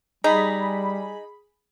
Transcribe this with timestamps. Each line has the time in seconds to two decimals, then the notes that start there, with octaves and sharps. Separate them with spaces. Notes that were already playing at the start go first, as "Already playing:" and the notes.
0.24 G3 D#4 G#4 B5